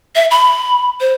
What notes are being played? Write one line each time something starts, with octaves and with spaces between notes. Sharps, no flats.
E5
B5
C5